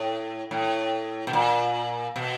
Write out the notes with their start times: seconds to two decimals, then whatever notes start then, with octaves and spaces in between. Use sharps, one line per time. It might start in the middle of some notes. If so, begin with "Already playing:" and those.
Already playing: A2
0.51 A2
1.27 B2
1.33 A#2
2.16 B2